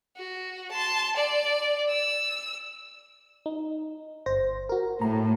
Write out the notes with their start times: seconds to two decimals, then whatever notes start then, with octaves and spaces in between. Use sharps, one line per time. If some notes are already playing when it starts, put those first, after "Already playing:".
0.17 F#4
0.71 A5 C6
1.16 D5
1.89 E6
3.46 D#4
4.26 G1 C5 A#6
4.69 F#4 A#4
5.02 A2 A#5